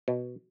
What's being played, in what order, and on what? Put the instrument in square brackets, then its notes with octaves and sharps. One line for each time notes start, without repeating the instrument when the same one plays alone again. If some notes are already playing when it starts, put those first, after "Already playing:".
[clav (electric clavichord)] B2